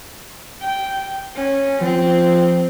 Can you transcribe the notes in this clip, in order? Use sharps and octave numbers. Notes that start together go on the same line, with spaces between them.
G5
C#4
F3 C4